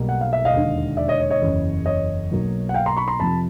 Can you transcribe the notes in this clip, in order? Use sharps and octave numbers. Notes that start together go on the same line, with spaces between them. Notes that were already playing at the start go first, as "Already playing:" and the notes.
Already playing: B1 B2 G3 A#3
F#5
F5
E5
D#5 F5
E1 D#2 D3
D5 E5
C#5 D#5
C#5
C#5 D#5
F#1 E2 C#3
C#5 D#5
B1 B2 F#3 A#3
F#5
F5 G5
A#5 C6
B5 C#6
A#5 C6
F2 C3 F3 A5 B5